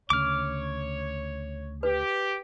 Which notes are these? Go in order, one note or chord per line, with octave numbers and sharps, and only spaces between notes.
D2 C#3 C#5 D6 F6
G4 B4